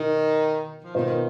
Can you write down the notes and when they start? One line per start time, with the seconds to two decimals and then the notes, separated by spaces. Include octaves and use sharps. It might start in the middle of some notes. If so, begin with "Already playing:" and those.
Already playing: B2 D#3
0.83 F3
0.94 B2 D#3 B3 F4 C5